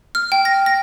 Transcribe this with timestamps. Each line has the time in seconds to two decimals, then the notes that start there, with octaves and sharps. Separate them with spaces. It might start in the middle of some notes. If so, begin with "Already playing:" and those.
0.15 F6
0.32 G5
0.45 A#6
0.66 A#6